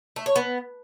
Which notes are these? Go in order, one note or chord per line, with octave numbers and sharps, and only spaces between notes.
A3
C#5
B3